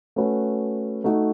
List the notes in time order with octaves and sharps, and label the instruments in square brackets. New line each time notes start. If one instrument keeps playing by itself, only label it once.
[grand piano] A3 C#4 F#4 B4
A3 D#4 F#4